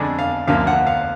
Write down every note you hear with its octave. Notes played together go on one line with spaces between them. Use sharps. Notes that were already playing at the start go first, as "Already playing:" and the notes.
Already playing: F2 D3 G#3 D4
F5
D2 D3 F3 A#3 F5
F#5
F5